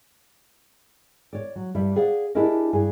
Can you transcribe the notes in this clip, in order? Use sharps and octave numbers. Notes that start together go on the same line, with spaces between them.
C#5 D5
F#3
G2 G3 E5
G#4 D5 F5 F#5
D4 E4 G4 G#4 A#4 D#5
G2 G#4